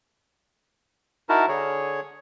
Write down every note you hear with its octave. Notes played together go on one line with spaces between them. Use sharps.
D#4 E4 F#4 A#4 A5
D3 G#4 C#5